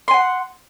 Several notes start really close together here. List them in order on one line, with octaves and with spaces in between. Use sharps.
C6 G#5 F#5